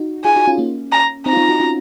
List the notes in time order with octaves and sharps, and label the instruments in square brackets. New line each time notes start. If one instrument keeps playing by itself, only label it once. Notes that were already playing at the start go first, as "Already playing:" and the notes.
Already playing: [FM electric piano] D#4 F#4
[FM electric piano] F4 G#4 [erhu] G#5
[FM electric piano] D#4 F#4
C#4 F4
A#3 C#4
[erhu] A#5
[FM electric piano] C4 D#4 [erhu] A#5
[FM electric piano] F4
C4 D#4
D#4 F#4
C#4 F4